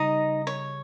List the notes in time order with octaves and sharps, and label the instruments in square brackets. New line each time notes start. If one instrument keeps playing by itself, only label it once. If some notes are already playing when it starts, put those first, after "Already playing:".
Already playing: [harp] C#3 G3 [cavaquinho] D#4 D#5
[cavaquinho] C#5